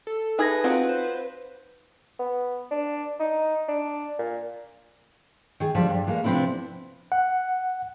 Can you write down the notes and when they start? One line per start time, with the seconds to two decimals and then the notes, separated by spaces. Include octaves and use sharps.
0.07 A4
0.39 D#4 E4 G#4 B4 G#6 A#6
0.64 F#3 C4 F4 F#5
0.89 C5
2.19 B3
2.71 D4
3.20 D#4
3.68 D4
4.19 A#2
5.60 D#3 G#4
5.75 D3 F3 G3 D5 A5
5.89 G2
6.07 E3 G#3 A#3
6.24 C3 F3 B3 C4 D4 E4
7.12 F#5